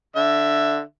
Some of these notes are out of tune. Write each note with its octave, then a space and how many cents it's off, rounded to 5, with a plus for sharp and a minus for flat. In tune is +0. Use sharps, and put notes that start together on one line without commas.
D3 +0 E5 +10